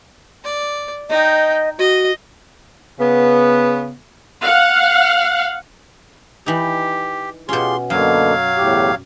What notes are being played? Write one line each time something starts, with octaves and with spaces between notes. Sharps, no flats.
D5
D#4 D#5 G5
F#4 D#5
C#3 B3
F5 F#5
E3 D#4 G4
B2 C#4 F4 G4 G#4 C6
F#2 B2 D3 F#3 A#3 F5
E2 A2 G4